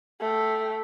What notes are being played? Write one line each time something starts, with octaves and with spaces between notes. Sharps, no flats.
A3 G5